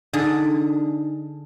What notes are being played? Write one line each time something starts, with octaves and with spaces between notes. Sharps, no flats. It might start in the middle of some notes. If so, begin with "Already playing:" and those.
D3 D4 D#4 G#4